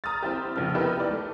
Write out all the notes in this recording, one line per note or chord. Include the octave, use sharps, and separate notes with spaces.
A#5 D#6 F6 A6
C4 E4 G4
F1 A#1 C#3 F3 F6
B3 D#4 E4 G4 A#4 B4
G4 D5
A3